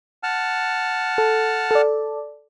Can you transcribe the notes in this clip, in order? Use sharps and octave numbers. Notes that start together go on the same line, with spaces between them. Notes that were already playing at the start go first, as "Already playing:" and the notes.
F#5 A5 F6
A4
A4 D5